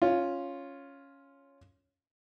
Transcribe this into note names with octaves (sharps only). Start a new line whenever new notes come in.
C#4 F4